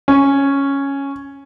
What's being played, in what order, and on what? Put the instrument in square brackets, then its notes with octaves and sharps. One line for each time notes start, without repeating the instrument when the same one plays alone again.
[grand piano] C#4